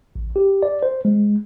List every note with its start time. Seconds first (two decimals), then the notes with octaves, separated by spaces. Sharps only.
0.16 A1
0.36 G4
0.63 D5
0.83 C5
1.05 G#3